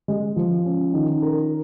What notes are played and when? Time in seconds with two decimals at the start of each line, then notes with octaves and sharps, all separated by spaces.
0.08 G#3
0.36 F3
0.65 C#4
0.94 D#3
1.22 A#4